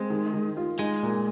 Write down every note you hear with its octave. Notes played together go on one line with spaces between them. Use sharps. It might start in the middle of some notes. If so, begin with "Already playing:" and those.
Already playing: G#3 C4
D#3
D#3
F4
G#3 D#4
A#2